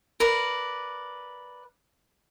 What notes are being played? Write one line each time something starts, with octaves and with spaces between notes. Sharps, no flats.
A#4 B4 D5